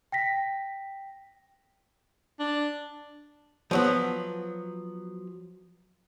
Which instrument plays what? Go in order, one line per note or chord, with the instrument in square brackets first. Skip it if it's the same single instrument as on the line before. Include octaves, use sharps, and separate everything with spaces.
[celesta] G5 A#6 B6
[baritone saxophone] D4
[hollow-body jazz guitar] F3 F#3 B3